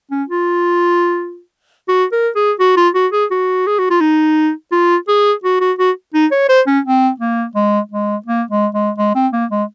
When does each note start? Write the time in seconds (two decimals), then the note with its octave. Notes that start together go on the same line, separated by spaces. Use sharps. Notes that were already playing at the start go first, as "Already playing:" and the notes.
0.11 C#4
0.29 F4
1.88 F#4
2.12 A#4
2.35 G#4
2.59 F#4
2.76 F4
2.95 F#4
3.12 G#4
3.31 F#4
3.67 G#4
3.79 F#4
3.90 F4
4.01 D#4
4.71 F4
5.08 G#4
5.43 F#4
5.60 F#4
5.78 F#4
6.14 D#4
6.31 C#5
6.49 C5
6.67 C#4
6.85 C4
7.20 A#3
7.55 G#3
7.91 G#3
8.26 A#3
8.51 G#3
8.74 G#3
8.98 G#3
9.15 C4
9.33 A#3
9.51 G#3